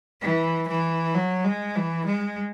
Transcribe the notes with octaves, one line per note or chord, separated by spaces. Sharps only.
E3
E3
F#3
G#3
E3
G#3